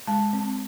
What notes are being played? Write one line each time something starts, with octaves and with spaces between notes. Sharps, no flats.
G#3 A5
C4